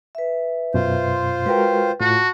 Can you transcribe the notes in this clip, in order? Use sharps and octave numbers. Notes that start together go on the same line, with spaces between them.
B4 E5
F#2 B2 F4 C5
G#3 F#4 A#4 B4 G5
A2 F4 F#4 A5